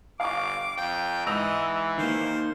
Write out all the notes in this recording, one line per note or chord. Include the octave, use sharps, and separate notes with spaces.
G1 F5 C#6 D6
F2 G5
G#2 E3 D#5 E6 F7
D#3 A#3 C5